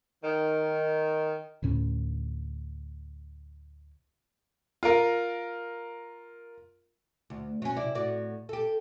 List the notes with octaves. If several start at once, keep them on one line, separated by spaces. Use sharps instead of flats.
D#3
D2 A2 C#4
F4 A#4
D2
F#3 C#4
C3 E4 D5
A2 F#4 D5
G4 A4